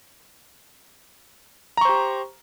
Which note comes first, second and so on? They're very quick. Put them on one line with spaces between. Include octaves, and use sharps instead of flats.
A#5 C#6 C5 G4